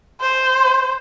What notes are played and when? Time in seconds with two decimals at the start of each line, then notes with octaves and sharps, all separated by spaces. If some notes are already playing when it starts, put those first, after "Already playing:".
0.20 C5